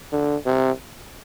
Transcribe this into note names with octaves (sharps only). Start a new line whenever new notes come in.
D3
C3